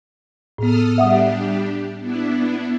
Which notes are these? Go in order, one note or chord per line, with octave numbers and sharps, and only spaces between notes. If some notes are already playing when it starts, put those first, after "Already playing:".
A2 B3 A4 D#6 F6
G3 D4 G4 E5 F#5 D#6
B3 D4 E4